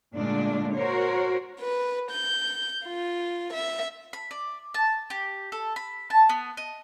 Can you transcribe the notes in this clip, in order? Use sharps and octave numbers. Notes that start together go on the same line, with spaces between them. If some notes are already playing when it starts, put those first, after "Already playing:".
A#2 D3 G#3 A3 D4
F#4 A#4 C5 C#5
B4
G6
F4
E5
B5
D5
A5
G4
A4
B5
A5
B3
D#5